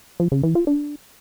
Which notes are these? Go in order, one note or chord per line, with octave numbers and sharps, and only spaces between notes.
F3
C#3
E3
F4
D4